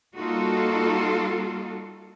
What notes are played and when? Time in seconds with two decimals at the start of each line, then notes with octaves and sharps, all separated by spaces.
0.17 G3 A#3 D#4 F4 F#4 A4